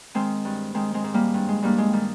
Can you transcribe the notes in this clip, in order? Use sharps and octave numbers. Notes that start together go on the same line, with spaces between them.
D#3 G#3 C4
G2
D#3 G#3 C4
G#3 C4
G#2
G3 A#3
G2
G#3
G2 G3 A#3
G#3
D#3 G3